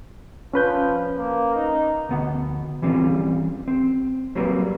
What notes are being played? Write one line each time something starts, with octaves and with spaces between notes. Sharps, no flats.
F3 C#4 B4 G6
A#3
D#4
D2 B3 F#5
E3 G3 C4 C#4 F4
C4
F#3 G3 A#3 C4 A#4 B4